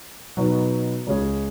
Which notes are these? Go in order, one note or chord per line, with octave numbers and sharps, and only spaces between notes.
B2 F#3 B3 D#4
C#2 C#3 G#3 C#4 G#4